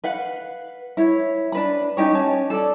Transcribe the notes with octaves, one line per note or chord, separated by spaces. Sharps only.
B4 F5 F#5
E4 C#5
D4 B4 B5
C#4 D#4 G4 C#5
C#4 A5
A4 D5